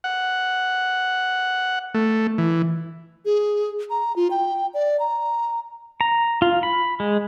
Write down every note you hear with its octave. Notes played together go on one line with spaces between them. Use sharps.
F#5
A3
E3
G#4
A#5
F4
G5
D5
A#5
A#5
F4
B5
G#3